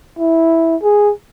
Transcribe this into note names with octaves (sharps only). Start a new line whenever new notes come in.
E4
G#4